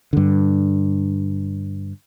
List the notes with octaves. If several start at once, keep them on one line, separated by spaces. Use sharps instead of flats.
G2 D3